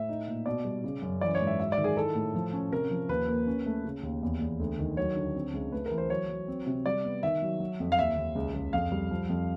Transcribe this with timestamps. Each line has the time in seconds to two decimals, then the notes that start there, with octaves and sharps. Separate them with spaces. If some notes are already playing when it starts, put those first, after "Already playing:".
Already playing: A2 E5
0.09 D#4
0.27 A#2
0.46 B2 D5
0.65 G3
0.84 C#3
1.02 F#2
1.21 E3 D5
1.35 C#5
1.41 G#2
1.47 E5
1.59 F#3 E5
1.72 D5
1.78 D#3
1.84 G#4
1.97 E4 A4
2.15 A2
2.35 F3
2.53 C#4
2.72 C3 A#4
2.91 F3
3.09 D#2 B4
3.28 A#3
3.47 C#4
3.66 A3
3.85 C#3
4.03 D#2
4.23 E2
4.42 E2
4.60 D2
4.79 D#3
4.97 F#3 C#5
5.16 D3
5.35 C4
5.53 C#2
5.72 A3 B4
5.86 A#4
5.91 E3
5.98 C5
6.10 F#3 C#5
6.28 F#3
6.48 C4
6.67 C3
6.86 G3 D5
7.05 B3
7.23 D#3 E5
7.42 F#3
7.60 F#3
7.80 F2
7.92 F5
7.99 D#2 E5
8.17 D#2
8.35 C#2
8.54 C#2
8.73 F2 F5
8.92 G3
9.11 F3
9.29 F2